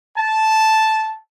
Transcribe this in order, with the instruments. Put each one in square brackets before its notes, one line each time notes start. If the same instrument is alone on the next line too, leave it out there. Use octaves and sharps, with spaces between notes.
[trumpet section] A5